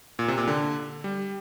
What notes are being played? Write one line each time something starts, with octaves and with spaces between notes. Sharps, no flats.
A#2
C3
A#2
D3
G3